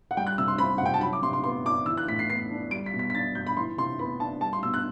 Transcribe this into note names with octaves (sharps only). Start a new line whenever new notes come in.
F#5
G3 G5
F#6
C3 E6
C6
C4 B5
C3 F#5
G5
A5
F#3 B5
D6
C3 C6
C6
B3 C6
D4 D6
E3 E6
F#6
A2 B6
C7
B3 C7
D4
G3 D7
B6
B2
B6
B6
D4 A6
B2 G6
B5
E3 C6
C3 C6
B3 B5
D4 A5
G3 A5
C6
B2 E6
F#6